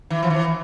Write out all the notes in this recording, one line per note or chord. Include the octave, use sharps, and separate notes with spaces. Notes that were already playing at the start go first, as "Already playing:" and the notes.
E3
F3
E3